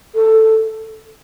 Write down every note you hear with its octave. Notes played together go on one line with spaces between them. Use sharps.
A4